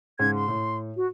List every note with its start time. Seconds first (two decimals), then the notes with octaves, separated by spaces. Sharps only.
0.19 G#2 C#3 G#6
0.35 C6
0.48 A2
0.97 F#4